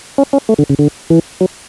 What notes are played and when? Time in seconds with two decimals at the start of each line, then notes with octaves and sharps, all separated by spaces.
0.18 C#4
0.33 C#4
0.49 A3
0.59 D3
0.70 C#3
0.79 D3
1.10 E3
1.41 F#3